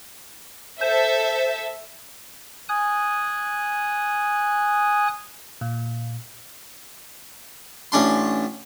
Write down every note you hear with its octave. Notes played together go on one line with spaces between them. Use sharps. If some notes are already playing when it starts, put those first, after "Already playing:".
A4 C5 E5
G#5 D#6 F#6
A#2
A1 C#4 D4 C6